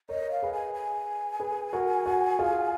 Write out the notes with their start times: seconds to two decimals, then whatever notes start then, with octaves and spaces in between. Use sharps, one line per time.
0.09 A#4 C#5 D#5
0.31 F5
0.43 G#4 B4
0.53 G#5
0.74 G#5
1.40 G#4 B4
1.73 F#4 A#4
2.06 F#4
2.39 F4 G#4